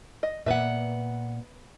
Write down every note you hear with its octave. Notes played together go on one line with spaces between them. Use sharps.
D#5
A#2 B3 B4 E5 F#5